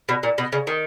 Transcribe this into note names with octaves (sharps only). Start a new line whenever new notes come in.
B2
A#2
B2
C#3
D#3